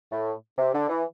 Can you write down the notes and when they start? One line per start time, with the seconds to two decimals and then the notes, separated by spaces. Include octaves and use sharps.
0.11 A2
0.58 C3
0.74 D3
0.89 E3